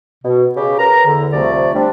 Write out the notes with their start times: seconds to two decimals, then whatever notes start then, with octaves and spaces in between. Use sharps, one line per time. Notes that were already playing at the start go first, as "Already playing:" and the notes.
0.23 B2
0.55 C#3 G4
0.78 A#4 B4 A#5
1.06 E2 D3
1.32 C2 F3 A3 D5
1.74 G3 C4 D4